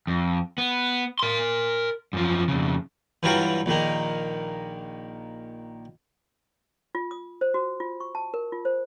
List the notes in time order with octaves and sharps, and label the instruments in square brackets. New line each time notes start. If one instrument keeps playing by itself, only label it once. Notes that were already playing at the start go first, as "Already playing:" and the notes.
[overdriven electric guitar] F2
B3
A#4 C6
F#2 F3
F2 C#3
[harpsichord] G2 E3 F#3 G3 F4 F#4
A#1 D#3 A#3
[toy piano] F4
D#6
C5
F#4
F4
C#6
A5
A#4
F4
C5